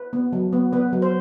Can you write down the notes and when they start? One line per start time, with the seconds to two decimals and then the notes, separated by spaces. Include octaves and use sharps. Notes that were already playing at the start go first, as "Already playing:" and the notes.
Already playing: B4
0.13 B3
0.33 F#3
0.53 B3
0.73 B3 B4
0.93 F#3
1.02 C5